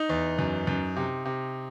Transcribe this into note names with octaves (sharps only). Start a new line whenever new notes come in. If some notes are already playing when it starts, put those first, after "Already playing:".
Already playing: D#4
E2
F#2
F#2
C3
C3